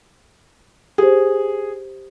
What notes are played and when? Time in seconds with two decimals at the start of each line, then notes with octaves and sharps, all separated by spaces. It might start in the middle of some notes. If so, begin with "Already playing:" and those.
0.98 G4 G#4 C5